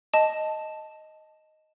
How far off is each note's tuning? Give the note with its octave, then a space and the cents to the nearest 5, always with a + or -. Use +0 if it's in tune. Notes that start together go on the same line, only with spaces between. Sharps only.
D#5 +0 A5 +0